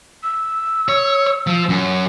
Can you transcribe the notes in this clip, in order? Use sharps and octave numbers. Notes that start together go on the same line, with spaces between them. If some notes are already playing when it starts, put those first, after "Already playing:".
E6
C#5
F3
F#2